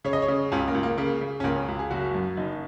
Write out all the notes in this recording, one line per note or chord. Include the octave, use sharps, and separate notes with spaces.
C#3 C#5
D#5
C#5
C#3
C#2 C#4
A#3
C#2
A#3
C#3 A#3
C#3
C#4
C#2 A#3
C#4
C#2
G#4
F#1 F#4
F#2
F#1 D#4